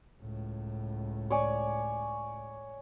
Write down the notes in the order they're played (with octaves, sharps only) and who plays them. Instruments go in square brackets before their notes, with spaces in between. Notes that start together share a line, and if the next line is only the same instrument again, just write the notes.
[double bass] C#2 A2
[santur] C#5 D5 G#5